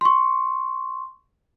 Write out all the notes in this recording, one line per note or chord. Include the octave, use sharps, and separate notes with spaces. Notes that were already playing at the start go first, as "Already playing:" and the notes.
C6 C#6